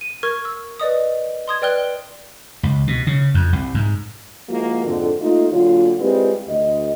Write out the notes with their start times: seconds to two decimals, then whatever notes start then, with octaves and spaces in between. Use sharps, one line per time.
0.01 D#7
0.23 A#4 C#6 F6 G#6
0.45 E6
0.80 B4 D5 D#5 D#6
1.48 C6 D#6 G#6
1.62 B4 D5 G5 F6 F#6 G7
2.63 C#2
2.87 B2
3.07 C#3
3.34 F2
3.53 C2
3.75 G#2
4.49 F3 G#3 A#3 E4 F#4
4.85 F2 G#2 D3
5.21 A3 A#3 D#4 F4
5.51 A#2 D3 F#3 F4
6.00 G3 G#3 C4 E4 F4 B4
6.49 D2 D#5